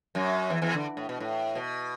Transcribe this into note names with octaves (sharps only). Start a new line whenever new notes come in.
F#2 F#3
E2 E3
E2 E3
D3
A2
B2
A2
B2